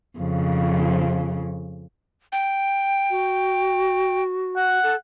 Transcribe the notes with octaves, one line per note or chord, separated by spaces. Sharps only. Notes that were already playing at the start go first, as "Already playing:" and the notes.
F2 C#3
G5
F#4
F#5
A4